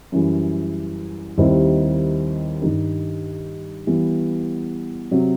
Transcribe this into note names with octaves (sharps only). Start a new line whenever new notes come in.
F#2 E3 G3
D#2 D#3 G3 C4 E4
G2 D#3 G3 D#4
E3 G3 B3
C3 F#3